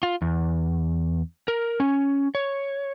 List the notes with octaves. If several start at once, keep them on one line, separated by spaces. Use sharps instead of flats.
F4
E2
A#4
C#4
C#5